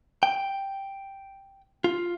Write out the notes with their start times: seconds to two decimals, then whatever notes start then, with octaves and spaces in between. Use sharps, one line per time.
0.23 G5
1.84 F4